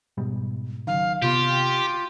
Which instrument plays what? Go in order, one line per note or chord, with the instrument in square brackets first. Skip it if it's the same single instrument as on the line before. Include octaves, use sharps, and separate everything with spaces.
[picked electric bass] G#2 B2 G3
[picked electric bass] F#1 F#2 D#3 [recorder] F5
[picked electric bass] C3 B3 [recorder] F4 [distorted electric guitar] G4